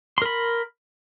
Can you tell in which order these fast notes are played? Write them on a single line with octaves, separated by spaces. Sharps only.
C6 A#4 B5